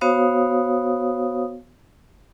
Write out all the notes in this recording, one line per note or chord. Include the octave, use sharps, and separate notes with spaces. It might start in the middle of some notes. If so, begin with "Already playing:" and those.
B3 F#4 C5 C#5 F5 D#6